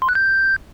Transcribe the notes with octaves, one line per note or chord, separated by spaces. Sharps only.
C6
F#6
G6